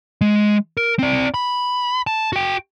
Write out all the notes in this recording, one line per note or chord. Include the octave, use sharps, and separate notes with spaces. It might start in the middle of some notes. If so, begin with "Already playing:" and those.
G#3
A#4
C4 D5
B5
A5
F#4 G5